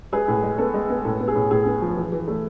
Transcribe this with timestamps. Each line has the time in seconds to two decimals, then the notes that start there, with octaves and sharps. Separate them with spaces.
0.12 G#3 G#4 B4
0.28 A2
0.43 G#3
0.58 B3 A4
0.74 G#3
0.90 B3
1.05 A2 A4
1.20 B3
1.28 G#4
1.36 A2
1.51 A2 G#4
1.66 B3
1.82 F3
1.97 E3
2.12 E3
2.28 A3